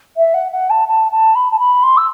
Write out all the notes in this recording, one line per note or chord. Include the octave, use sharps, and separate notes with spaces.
E5
F#5
F#5
A5
A5
A5
B5
A5
B5
C6
E6